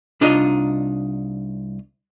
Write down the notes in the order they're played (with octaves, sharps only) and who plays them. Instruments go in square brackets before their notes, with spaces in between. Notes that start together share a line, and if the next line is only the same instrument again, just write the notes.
[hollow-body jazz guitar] C2 D4 D#4 F4 D#5